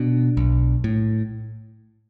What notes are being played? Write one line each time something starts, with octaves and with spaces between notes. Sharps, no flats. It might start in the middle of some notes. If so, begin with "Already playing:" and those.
Already playing: B2 D4
B1
A2